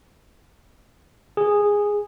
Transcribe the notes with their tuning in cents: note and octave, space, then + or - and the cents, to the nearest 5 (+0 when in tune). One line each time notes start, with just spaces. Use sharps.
G#4 -10